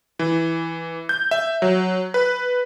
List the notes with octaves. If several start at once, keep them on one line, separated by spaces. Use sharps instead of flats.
E3
G6
E5
F#3
B4